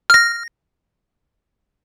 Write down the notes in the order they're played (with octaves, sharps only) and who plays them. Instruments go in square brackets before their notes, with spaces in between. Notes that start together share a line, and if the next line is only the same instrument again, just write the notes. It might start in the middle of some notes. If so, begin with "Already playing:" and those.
[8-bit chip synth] F6 A#6